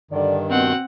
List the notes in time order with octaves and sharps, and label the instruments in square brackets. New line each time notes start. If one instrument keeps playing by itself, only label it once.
[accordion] G2 D#3 [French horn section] D3 D5
[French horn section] B2 [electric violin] C4 F#5